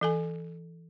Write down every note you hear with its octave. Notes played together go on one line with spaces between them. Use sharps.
E3 A4 G#5